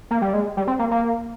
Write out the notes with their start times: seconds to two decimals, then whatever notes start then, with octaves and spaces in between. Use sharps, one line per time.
0.11 A#3
0.22 G3
0.33 G#3
0.57 G3
0.67 C4
0.79 A#3
0.91 A#3